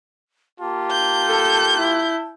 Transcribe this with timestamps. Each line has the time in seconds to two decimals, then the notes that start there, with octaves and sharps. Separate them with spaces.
0.60 A#3 F4 G4 A5
0.91 G6
1.27 A4
1.77 E4